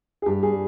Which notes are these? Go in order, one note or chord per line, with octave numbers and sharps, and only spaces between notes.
G#4
G2 G4
G#4
G3